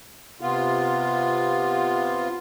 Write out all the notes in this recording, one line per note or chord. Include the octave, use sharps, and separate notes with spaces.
C3 B3 F4